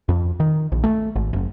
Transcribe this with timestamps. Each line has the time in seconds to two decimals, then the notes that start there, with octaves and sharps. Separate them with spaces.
0.09 F2
0.40 D#3
0.72 A#1
0.84 A3
1.16 G#1
1.33 F#1